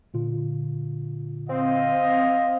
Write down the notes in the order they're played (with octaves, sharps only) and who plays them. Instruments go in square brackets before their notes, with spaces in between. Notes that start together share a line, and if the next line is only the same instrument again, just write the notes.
[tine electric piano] A#2 D3 F4
[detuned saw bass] C4 [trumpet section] D#5 F5